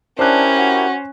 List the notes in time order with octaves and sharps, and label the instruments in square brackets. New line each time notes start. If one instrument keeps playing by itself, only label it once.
[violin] C#4 [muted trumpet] D4 [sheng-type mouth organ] E4 G4 A#4 [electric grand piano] C5 F#6
[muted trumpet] F#4